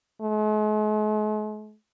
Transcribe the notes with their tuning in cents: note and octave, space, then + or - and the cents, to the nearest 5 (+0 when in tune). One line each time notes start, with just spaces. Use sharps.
G#3 +45